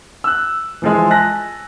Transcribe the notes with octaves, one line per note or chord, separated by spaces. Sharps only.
E6 F#6
E3 F3 G#3
G#5 A5 F#6 A#6